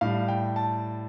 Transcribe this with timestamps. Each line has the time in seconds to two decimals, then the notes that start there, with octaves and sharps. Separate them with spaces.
0.01 A2 G3 F5
0.28 G5
0.56 A5